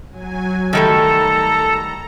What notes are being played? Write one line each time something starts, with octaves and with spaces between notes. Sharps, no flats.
F#3 G#5
D#3 G3 A3 A4 A#5